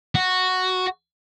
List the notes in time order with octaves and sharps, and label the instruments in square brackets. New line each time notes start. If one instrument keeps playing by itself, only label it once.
[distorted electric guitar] F#4